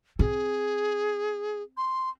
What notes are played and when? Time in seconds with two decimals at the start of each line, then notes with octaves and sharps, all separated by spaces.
0.19 C4 G#4
1.77 C6